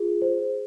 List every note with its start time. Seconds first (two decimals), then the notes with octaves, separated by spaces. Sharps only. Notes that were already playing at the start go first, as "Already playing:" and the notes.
Already playing: F4 G#4
0.22 C5